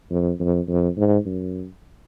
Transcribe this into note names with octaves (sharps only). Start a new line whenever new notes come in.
F2
F2
F2
G#2
F#2